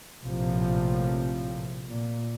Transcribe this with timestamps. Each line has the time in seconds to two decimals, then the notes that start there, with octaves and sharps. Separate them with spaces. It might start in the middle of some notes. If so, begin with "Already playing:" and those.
0.23 A#1 A2 C3 F3
1.89 A#2